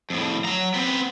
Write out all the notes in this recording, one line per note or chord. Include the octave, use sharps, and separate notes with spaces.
F2 A2
F#3 A#5
B3 C4